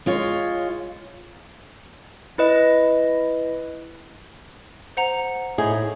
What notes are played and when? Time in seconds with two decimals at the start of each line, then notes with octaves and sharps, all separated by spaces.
0.06 G#3 F4 C#5
2.38 E4 B4 D#5
4.97 C5 F#5 A#5
5.58 A2 D#4 G#4